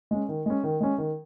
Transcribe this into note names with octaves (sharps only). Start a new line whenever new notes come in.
G#3 C#4
D#3
G#3 C#4
D#3
G#3 C#4
D#3